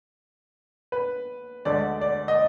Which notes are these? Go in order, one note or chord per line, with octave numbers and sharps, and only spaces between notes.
B4
D2 D3 G#3 D5
D5
D#5